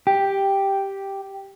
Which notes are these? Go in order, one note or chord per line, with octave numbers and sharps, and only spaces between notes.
G4